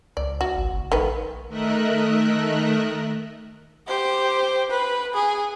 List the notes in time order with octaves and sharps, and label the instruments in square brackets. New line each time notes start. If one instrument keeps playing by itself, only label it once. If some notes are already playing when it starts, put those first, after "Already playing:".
[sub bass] C#2 [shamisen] D5
[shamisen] F#4
[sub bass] G#1
F#1
[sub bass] A#1 [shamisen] D#3 A3 B4
[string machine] D#3 A3 A#4 D#5 E5 F#6
[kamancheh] G4 C5
B4
G#4